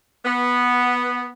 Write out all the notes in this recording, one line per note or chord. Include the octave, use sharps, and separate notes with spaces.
B3